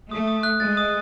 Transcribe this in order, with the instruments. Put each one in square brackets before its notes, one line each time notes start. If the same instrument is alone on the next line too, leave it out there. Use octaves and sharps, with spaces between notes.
[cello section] A3 [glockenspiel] D#6
[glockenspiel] D#6
F#6
[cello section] G#3 [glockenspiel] A6
[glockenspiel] D#6